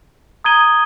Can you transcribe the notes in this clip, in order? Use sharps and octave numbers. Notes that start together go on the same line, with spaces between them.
A#5 D#6 G#6 D#7 G7